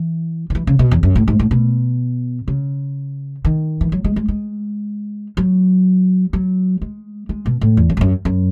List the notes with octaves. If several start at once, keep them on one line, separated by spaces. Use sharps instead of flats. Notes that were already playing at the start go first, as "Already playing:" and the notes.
Already playing: E3
D#3
E3
C#3
B2
E2
F#2
A2
G#2
A2
B2
C#3
D#3
E3
F#3
G#3
G#3
G#3
F#3
F#3
G#3
G#3
B2
A2
E2
F#2
G#2
F#2
F#2